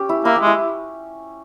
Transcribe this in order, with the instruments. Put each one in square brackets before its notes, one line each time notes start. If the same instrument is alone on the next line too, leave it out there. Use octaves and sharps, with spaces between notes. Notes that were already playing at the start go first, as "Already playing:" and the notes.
Already playing: [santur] C#4 G4
E4
[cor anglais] A#3 [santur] E4
[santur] G4
[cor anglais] G#3
[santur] E4